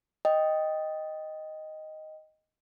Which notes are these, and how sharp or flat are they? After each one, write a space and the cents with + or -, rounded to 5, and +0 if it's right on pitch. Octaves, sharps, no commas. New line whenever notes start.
D#5 +0 G5 +0